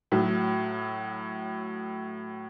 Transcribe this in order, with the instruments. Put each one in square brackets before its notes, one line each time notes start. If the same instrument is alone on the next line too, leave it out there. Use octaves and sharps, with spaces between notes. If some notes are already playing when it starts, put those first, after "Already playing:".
[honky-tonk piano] A2 F#3